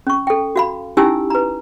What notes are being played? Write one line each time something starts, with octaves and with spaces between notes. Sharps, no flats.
C#4 C#6
A4 G5
F#4 F5 B5
C#4 D#4 E4 G4 G#5 E6
B4 A#5